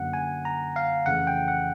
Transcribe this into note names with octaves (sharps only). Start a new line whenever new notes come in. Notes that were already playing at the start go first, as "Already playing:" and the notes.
Already playing: F#2 D3 F#3 A#3 F#5
G#5
A#5
F5
F2 C#3 E3 A3 F#5
G5
F#5